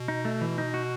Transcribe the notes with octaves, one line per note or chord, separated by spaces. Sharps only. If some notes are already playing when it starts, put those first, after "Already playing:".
Already playing: B2
D#4
A3
E3
D#4
F#4